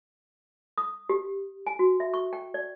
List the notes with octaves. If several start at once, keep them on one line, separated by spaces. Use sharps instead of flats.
D#6
G4
G#5
F#4
E5
C#6
G5
D5